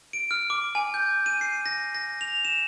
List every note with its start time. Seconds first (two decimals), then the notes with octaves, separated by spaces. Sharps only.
0.13 D7
0.31 F6
0.50 D6
0.75 G#5
0.94 G6
1.26 D#7
1.41 C7
1.66 A#6
1.95 A#6
2.21 F7
2.45 E7